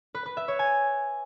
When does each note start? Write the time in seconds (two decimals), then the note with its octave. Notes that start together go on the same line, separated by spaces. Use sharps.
0.15 B4
0.26 B4
0.37 E5
0.48 C#5
0.59 G#5